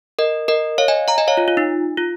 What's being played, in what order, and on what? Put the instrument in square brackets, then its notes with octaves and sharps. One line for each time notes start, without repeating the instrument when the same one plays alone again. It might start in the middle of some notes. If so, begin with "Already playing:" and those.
[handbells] A#4 D#5
A#4 D#5
C#5 F5
D#5 G#5
F5 A#5
D#5 G#5
C#5 F5
F4
F4
D#4
F4